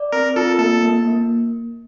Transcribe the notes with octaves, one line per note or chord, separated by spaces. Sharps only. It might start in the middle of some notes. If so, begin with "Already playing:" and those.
Already playing: D5
C4 A#4
F4 A4
A#3 A4
A#3
A#3